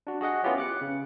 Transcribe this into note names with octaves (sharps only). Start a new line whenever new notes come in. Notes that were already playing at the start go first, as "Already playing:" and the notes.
D4 F#4
F#4 G#4 D#5 F#5
B3 C#4 E4 F4 G4 C#5
D6 F#6 C#7
C#3